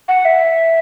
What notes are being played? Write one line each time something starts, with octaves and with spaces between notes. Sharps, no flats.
F#5
E5